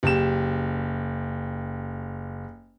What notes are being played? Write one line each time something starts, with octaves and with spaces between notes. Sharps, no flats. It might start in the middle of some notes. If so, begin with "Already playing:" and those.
F#1 G4 E7